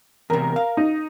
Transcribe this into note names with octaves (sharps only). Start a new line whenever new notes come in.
E2 C3 A#4
F5
D#4